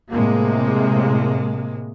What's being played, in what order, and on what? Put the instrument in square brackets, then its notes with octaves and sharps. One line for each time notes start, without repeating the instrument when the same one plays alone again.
[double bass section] A2 C3 G#3 A#3